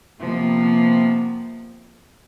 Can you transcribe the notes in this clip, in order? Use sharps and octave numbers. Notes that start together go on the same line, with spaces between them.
C3 F3 A#3 B3